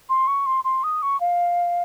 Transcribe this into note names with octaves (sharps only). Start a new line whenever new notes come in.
C6
C#6
C6
C6
D#6
C#6
F5